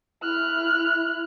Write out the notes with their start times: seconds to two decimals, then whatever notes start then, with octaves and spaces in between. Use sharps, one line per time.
0.23 E4 F6 F#6